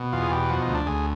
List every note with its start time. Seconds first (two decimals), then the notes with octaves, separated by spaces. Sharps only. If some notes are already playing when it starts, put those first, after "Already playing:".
Already playing: B2
0.12 E2 F4
0.22 G#4
0.31 B2 G4
0.49 F3 F#4
0.62 D#4
0.68 D2
0.75 D4
0.86 D2 G#4